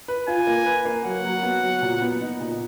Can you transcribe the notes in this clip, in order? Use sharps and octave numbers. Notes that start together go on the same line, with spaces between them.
B4
F4 G#5
A#3
B4
A#3
F#3 F#5
F#3
B3
F#3
A#2
B3
D#4
A#2